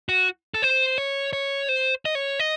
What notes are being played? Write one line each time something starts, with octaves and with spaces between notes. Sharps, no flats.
F#4
A4
C5
C#5
C#5
C5
D#5
C#5
D#5